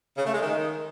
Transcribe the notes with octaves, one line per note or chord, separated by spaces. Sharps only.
C#3
A3
G#3
D#3